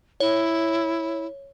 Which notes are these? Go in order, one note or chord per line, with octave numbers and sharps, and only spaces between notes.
E4 C#5